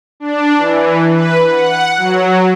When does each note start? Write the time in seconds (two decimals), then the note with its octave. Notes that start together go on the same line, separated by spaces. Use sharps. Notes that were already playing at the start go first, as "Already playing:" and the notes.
0.20 D4
0.58 E3
1.10 B4
1.50 F#5
1.98 F#3